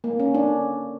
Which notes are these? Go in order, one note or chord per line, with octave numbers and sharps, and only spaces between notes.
A#3
C#4
D4